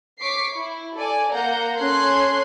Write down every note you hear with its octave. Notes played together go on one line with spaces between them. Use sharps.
C#5 C#6 D6 B6 C7
E4
A4 D5 G#5
A#3 F#5 A#5 G6
C#4 A4 C6 F#6 G#6 C7